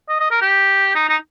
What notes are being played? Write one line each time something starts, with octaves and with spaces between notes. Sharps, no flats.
D#5
D#5
A#4
G4
D#4
D#4